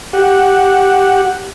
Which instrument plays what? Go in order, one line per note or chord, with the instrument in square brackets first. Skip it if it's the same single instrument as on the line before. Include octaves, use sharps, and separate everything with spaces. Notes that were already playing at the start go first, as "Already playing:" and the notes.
[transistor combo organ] G4 F#5